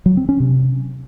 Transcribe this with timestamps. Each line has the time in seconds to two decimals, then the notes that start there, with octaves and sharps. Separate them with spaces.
0.06 F#3
0.17 C4
0.29 C#4
0.40 C3